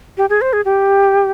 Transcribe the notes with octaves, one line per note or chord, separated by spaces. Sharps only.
G4
G#4
C5
G#4
G4